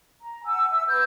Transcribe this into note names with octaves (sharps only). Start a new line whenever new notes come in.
A#5
F#5 G#5 E6
E5 E6
B4 E6 G6